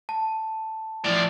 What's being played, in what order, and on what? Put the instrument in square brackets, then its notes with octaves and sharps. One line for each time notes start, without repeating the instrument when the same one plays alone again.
[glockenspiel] A5
[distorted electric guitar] A2 F3 [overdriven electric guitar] D5